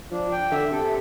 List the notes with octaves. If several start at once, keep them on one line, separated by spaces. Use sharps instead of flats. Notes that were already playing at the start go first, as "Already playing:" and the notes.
F3 D4
G5
D3 E5
C3 A4